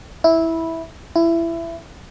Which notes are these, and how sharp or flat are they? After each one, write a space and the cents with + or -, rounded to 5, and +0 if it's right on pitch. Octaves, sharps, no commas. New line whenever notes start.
E4 -10
E4 +20